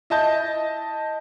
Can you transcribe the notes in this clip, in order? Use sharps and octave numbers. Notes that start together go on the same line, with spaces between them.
E4 D#5 A5 G6